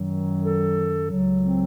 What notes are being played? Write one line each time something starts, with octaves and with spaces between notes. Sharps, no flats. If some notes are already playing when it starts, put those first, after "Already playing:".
Already playing: F#2 D#3 F#3
A4
C#2 C#3 F#3
C4